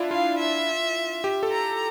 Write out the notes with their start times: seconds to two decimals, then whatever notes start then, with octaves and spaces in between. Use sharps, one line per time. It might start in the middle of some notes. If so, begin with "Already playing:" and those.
Already playing: D4 E4 F4
0.11 F4 F5
0.39 E5
1.24 G4
1.43 A4
1.52 A#5